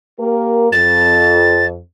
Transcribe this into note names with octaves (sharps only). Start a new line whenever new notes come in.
A#3 G4 A#4
F2 A6